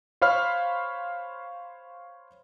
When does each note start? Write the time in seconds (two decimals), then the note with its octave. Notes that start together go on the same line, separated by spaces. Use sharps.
0.22 C5 C#5 F5 B5 F6